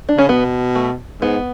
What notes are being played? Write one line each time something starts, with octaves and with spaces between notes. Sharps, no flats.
D4
C#3 C#4
B2 B3
A3
G#2 B3